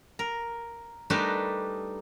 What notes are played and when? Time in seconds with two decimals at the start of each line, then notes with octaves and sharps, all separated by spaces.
0.19 A#4
1.10 G3 A3 D4 D#4 A#4 B4